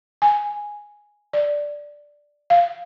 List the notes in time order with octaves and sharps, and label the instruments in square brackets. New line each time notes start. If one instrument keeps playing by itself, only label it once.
[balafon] G#5
D5
F5